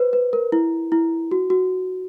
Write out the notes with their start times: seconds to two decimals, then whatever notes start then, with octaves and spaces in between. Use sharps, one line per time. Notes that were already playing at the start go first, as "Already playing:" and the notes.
Already playing: B4 C5
0.13 B4
0.33 A#4
0.52 E4
0.92 E4
1.31 F#4
1.50 F#4